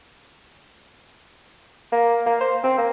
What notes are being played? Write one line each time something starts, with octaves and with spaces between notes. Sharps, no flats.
A#3
A#3
C5
C4
A#3